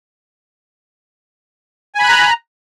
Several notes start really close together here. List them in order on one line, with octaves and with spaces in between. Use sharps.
G#5 B5 F#6 A#5